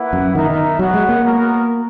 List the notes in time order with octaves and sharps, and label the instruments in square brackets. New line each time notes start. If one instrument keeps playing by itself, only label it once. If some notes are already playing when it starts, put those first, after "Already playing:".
Already playing: [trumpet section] A#3 E4 B4 F#5
[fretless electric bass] F#2
[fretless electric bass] D#3 [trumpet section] B3 D#4 A#4 E5
[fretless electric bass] D#3
[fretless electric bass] F#3 [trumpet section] B3 F#4 C#5 F#5
[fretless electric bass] G#3
A#3
[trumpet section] B3 F#4 A#4